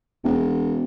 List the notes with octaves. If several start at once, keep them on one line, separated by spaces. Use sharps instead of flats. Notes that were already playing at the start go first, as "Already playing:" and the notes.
E1